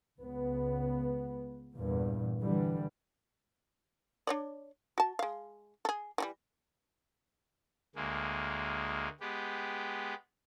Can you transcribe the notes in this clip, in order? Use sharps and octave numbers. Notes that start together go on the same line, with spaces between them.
C#2 B3
E2 G2 A#2
D3 E3 G3
D4 C#5 D5
F#4 A5
G#3 F5
G#4 A4
E3 F#3 G3
D2 G#3 A#3
G#3 B3 G4